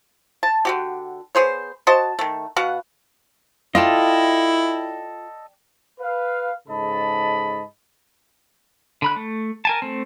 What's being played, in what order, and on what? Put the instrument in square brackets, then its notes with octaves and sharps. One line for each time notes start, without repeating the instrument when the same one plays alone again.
[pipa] A5
D3 F#4 G4
B3 G#4 C5 C#5
F#4 C5 D#5 A5
D#3 A3
B2 F#4 F5 F#5
[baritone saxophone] E4 [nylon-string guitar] F4 [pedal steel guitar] A4 D#5 [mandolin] D5 G5 A5
[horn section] B4 F5
G#2 C#3 A4 D#5 A5 B5
[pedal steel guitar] D3 B5 F#6
A3
A#4 G#5 A5
A3 C4